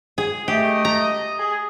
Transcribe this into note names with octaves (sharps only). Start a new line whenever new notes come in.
G#4
A3 G4 D#5
A#5
G#4